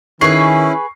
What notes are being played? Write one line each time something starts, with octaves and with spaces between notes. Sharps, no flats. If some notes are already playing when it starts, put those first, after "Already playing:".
D#3 C#4 E4 G#4 B4 C#6 C7